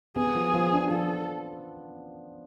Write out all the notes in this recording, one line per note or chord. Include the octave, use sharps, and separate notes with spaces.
B3 G#4
F3
F3
D4
F3 A4